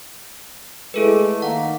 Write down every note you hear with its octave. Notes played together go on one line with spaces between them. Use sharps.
G#3 A3 E4 A4 B4
D#3 A#3 F#5